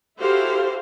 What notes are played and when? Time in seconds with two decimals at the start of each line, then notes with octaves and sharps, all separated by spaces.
0.19 E4 F#4 G4 A4 C5 F5